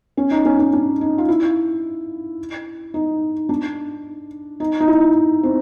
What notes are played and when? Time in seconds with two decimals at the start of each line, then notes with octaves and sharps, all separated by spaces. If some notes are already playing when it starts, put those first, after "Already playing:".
0.17 C#4
0.31 D#4
0.45 C#4
0.59 C#4
0.73 D4
1.01 D#4
1.18 F4
1.29 E4
2.94 D#4
3.49 D4
4.60 D#4
4.80 D#4
4.88 E4
5.43 C4